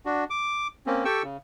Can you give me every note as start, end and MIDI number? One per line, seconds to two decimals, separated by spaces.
0.05 0.24 62
0.05 0.24 66
0.30 0.68 86
0.87 1.04 58
0.87 1.04 60
0.87 1.04 61
1.05 1.23 67
1.05 1.23 69
1.05 1.23 79
1.05 1.23 85
1.05 1.23 88
1.23 1.37 49